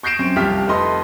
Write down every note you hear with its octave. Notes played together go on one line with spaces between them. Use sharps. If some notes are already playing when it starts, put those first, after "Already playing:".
C#6 G6 A#6 C7 D7 E7
F#2 C4
C2 F3 G4 F6 B6
F1 A4 B4 D#5 C6